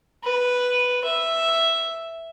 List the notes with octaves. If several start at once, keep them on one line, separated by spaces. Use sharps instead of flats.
B4
E5